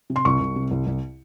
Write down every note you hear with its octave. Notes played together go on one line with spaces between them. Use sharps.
C3
C6
C2 C#6
C2
C3
C2
C2